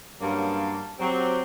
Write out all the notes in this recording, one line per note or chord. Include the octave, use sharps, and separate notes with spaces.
G2 F#3 A#3 C#4 F5 A5
F#3 C4 G4